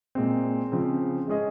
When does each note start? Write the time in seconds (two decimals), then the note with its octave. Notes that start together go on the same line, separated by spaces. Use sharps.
0.15 A#2 G#3 C4
0.72 C#3 F3 C4
1.28 G#3 C#4 G#4 D#5